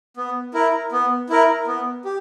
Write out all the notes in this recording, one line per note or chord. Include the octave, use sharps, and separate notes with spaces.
B3
E4 A#4
B3
E4 A#4
B3
G4